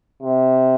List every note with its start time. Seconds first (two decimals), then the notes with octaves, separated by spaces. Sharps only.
0.22 C3